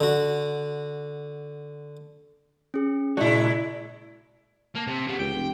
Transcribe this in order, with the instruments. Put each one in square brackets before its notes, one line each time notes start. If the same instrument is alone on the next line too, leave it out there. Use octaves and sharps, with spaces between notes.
[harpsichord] D3 F#4
[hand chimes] C#4 G#4
[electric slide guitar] A#2 F#4 [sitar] G#3 E4 [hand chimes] D5
[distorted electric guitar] A#3 [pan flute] A5
[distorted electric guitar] C3
[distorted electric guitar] C#3 B3 [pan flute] G4
[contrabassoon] C#2 [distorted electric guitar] G5
[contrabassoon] F1